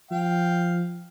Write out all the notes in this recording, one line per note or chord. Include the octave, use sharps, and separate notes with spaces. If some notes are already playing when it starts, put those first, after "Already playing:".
F3 F5 G5